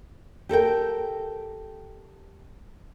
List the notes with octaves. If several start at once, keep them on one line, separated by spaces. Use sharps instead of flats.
G4 A4 A#4 G5